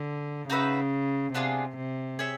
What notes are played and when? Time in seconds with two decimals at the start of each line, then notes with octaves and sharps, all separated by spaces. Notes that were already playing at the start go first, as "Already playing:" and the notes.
Already playing: D3
0.49 C#3 D#4 F#4 B4 E5
1.34 C3 B3 D4 F4 G#4
1.77 C3
2.19 G#4 C#5 E5 G5